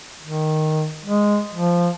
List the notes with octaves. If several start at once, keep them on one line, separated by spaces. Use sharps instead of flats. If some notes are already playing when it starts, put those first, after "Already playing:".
D#3
G#3
F3